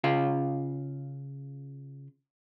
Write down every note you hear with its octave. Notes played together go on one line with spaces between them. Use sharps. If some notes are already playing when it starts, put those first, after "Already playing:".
C#3 F4 F5